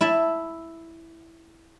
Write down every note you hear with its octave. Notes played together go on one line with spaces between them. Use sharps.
E4 E5 A5